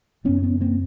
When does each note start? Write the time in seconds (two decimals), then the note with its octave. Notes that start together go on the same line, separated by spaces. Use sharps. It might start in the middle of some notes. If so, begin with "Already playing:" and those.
0.24 F#2 C#3 B3 C#4
0.43 B3 C#4
0.61 A#3 C4